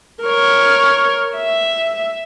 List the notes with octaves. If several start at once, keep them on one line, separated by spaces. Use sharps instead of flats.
A#4 C#5
E5